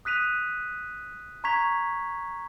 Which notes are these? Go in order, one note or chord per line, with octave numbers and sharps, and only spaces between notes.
D#6 F#6 B6 D#7 F7
A#5 C#6 G#6 B6 F7